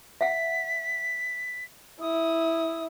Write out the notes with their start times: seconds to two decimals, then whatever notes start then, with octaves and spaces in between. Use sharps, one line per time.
0.21 E5 F#5 B6
2.01 E4 D#6